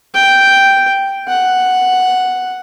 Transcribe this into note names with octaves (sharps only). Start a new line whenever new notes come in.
G5
F#5